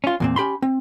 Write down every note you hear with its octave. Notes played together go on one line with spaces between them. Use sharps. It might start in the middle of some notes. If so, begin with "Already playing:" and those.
C#4 F4
E2 A#2 C4
C#4 G4 B5 C6
C4